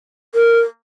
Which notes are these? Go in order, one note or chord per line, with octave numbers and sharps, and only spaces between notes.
A#4